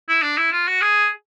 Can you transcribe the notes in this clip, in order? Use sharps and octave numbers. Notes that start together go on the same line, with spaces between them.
E4
D4
E4
F4
F#4
G#4